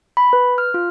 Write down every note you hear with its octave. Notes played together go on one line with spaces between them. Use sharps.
B5
B4
F6
F4